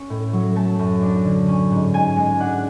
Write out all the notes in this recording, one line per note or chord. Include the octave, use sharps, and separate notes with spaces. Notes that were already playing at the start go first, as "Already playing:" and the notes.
Already playing: C#4 C#5
A2
F#3
A3 A5
F#2
D4
D3
C#4
G#2
G#2 G#5
G#3
D4 F#5